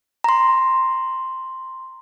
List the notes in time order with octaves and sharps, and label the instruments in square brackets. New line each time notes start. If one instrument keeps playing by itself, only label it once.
[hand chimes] A#5 C6